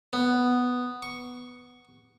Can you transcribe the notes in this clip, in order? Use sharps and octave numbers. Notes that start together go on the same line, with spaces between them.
B3
C#6